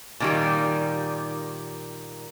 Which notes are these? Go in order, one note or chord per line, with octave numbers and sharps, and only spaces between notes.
A#2 D#3 G3